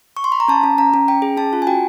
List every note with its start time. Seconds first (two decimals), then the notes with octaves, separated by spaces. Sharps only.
0.17 C#6
0.24 C6
0.32 B5
0.40 A#5
0.48 C#4 A5
0.63 C#4
0.78 C#4 A#5
0.94 C#4
1.08 C#4 G5
1.22 G#4
1.37 C#4 A5
1.53 F4
1.62 G#5
1.67 F#4 G5